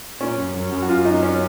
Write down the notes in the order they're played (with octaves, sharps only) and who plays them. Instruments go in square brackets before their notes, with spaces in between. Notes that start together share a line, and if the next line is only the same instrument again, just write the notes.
[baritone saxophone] A#2 [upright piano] C#4
[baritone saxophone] F#2
F#2
F#2
[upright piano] F#4
[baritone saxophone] F#2 [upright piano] F4
[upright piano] D#4
C#4